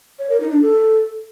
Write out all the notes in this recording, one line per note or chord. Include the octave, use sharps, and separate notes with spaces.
C#5
A#4
D#4
D4
A4